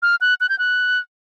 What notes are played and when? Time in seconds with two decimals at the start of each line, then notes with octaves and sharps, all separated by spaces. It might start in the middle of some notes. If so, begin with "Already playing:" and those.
0.02 F6
0.21 F#6
0.41 F#6
0.49 G6
0.59 F#6